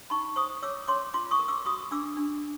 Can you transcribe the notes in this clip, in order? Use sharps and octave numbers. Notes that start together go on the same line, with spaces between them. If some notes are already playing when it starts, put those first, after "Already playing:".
D#4 B5 C#6
C5 C#6 D#6
C#5 D6 E6
C#5 C6 D6
F4 C6 D6
C#6 D#6
A#4
D6 E6
F#4 C#6 D#6
D4 D6 E6
D4